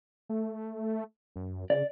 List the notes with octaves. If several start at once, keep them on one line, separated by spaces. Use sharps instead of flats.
A3
F#2
C#3 D5